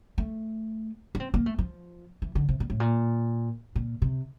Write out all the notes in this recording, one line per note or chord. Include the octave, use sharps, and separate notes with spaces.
A3
D4
C4
A#3
A3
F3
E3
D3
C3
A#2
A2
A#2
A#2
C3